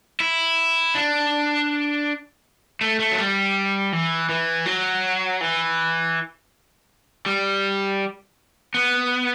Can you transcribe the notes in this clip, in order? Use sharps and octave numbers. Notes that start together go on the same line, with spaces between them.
E4
D4
A3
A3
F#3
G3
E3
E3
F#3
E3
G3
B3